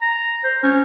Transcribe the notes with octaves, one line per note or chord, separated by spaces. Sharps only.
A#5
C5
C#4